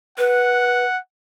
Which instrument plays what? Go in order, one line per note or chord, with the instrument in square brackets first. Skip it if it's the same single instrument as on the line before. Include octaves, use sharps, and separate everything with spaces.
[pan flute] B4 [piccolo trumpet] F#5